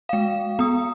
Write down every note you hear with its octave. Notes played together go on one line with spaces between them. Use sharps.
G#3 F5
B3 D#6